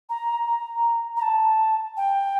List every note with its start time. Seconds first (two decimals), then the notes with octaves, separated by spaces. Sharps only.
0.10 A#5
0.47 A#5
1.17 A#5
1.22 A5
1.97 G5